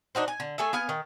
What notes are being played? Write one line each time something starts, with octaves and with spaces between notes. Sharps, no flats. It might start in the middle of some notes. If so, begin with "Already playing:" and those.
D4 D#4 F#4 C5
G#5
D3
A3 G#4 A4 E5
B3 F5 G#5
D#3